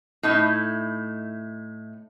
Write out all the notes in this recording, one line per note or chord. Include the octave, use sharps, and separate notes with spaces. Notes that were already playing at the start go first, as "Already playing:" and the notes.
A2 D#4 E4